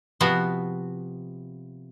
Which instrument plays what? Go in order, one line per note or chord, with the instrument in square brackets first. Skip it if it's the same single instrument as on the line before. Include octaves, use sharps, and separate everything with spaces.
[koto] C3 F3 B3 F#4